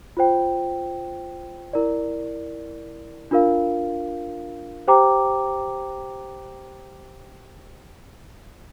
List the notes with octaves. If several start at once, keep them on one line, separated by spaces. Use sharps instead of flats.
F4 C5 G5
E4 A#4 D5
D4 F4 A#4 F5
G4 C5 G5 A#5 D6